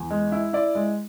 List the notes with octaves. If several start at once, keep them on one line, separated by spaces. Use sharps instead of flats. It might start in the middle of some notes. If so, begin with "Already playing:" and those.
Already playing: E2
G#3
E4
E4 D5
G#3